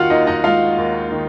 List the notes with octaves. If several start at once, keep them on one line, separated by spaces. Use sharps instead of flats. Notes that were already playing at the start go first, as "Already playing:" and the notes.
Already playing: D#2 D#3 F4 F#4 F5 F#5
D#2 D#4 D#5
D#4 D#5
G#3 F4 F5
D#2
D#3